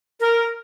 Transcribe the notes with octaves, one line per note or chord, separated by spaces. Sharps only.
A#4